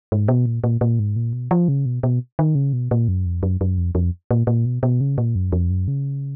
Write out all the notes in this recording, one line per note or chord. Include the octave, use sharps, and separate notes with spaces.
G#2
B2
A#2
A#2
A#2
G#2
A#2
B2
F3
C#3
B2
B2
D#3
C#3
B2
A#2
F#2
F2
F#2
F#2
F2
F2
A#2
A#2
B2
B2
C#3
A#2
F#2
F2
F#2
C#3